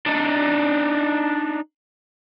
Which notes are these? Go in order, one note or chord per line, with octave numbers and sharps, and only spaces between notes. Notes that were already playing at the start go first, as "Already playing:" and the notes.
D4 D#4